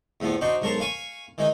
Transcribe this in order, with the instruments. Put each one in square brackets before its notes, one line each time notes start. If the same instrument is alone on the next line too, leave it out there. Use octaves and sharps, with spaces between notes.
[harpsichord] E2 A2 F3 B3
D4 D#4 F#4 C5
B1 G#2 A#4 C#5 A5 C6
F5 G#5 B5 C#6
D#3 E3 G#3 D#4